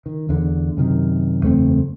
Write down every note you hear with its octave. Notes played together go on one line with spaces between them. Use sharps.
D#3
E2 D3
F#2 C3 D#3
F#1 E2 A3 C4